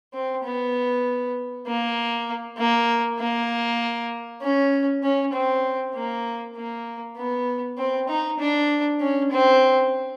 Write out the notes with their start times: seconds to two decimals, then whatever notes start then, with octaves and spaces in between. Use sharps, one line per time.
0.13 C4
0.44 B3
1.67 A#3
2.58 A#3
3.19 A#3
4.42 C#4
5.03 C#4
5.33 C4
5.95 A#3
6.56 A#3
7.17 B3
7.78 C4
8.08 D#4
8.39 D4
9.01 C#4
9.31 C4